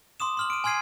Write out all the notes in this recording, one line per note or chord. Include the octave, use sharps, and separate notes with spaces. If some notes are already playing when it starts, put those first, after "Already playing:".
C6 D6 D#6 E7
C6 F6 F#7
D7 D#7
G#5 C6 F6 G#6 C7 D#7